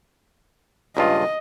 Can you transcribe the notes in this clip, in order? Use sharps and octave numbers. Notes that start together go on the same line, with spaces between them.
C#2 G2 F4 D#5